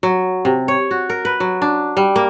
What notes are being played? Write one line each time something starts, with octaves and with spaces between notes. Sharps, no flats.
F#3
C3
C#5
F#4
A#4
B4
F#3
D4
G3
A#3